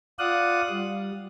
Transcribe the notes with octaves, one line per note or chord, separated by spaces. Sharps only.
F4 D5 F5 F#5 D#6 F#6
G3